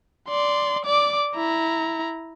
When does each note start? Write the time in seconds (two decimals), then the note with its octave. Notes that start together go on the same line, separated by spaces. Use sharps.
0.29 D5 C6
0.85 D5 D6
1.35 E4 A#5